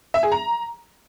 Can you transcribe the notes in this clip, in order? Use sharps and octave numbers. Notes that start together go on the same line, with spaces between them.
E5
G#4
A#5